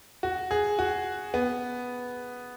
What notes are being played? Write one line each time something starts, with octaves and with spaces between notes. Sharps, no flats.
F#4
G#4
F#4
B3